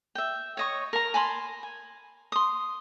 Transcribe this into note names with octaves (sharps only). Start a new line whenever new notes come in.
E5 G5
C#5 D#5 C#6
A#4 A#5
G#5 A5 B5 C6
G#5
C6 D#6